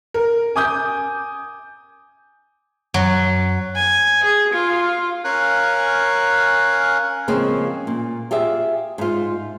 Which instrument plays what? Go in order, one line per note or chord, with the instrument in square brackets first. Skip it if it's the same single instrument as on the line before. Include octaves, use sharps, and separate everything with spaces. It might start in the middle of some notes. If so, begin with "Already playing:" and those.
[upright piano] A#4
G#5 D6 D#6 G6
[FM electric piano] F#2 [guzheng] F#3
[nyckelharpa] G#5
G#4
F4
[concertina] C#4 A#4 F5 G#5 F#6
[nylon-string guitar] C#3 F3 G#3 A#3 C4
A#2
F4 G4 G#4 E5
G#2 F4